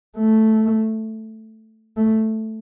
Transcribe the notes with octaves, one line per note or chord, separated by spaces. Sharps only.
A3
A3